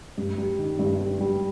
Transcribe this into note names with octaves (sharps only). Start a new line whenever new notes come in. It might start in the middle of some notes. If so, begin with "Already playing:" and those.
G2
G3
D#3
G2
G2
G3